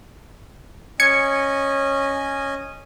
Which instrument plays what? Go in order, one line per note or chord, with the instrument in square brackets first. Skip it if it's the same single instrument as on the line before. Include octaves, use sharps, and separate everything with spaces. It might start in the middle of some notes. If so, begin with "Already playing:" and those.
[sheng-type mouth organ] C#4 D#5 G#5 [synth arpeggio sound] G#6 C#7